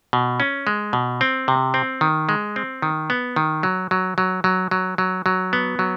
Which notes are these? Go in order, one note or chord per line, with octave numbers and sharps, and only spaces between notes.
B2
C#4
G#3
B2
C4
C3
C4
D#3
G#3
C4
D#3
B3
D#3
F#3
F#3
F#3
F#3
F#3
F#3
F#3
B3
F#3